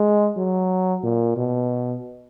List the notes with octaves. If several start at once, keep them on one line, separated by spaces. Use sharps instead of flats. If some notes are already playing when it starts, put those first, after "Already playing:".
Already playing: G#3
F#3
A#2
B2